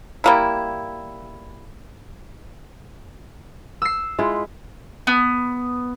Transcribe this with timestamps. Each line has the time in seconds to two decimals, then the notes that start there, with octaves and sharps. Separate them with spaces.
0.24 G3 A#3 E4
3.82 E6 C7
4.19 G#3 E4 F4
5.07 B3